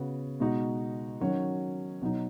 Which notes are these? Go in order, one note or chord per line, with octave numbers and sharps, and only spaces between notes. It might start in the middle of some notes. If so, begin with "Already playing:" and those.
Already playing: C#3 B3 F#4
B2 G#3 D#4 F#4
D#3 F#3 C#4 F#4
B2 F#3 D#4